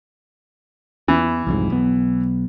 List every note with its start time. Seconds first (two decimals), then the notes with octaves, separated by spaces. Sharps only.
1.08 E2 E3
1.47 C2 F2 G#2
1.70 B1 B3